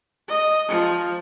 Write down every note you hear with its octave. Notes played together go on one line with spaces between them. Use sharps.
D#5
F3